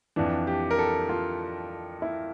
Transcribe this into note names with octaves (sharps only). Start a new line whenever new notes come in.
F2 E3 D4
G4
A#4
A4
F4
E4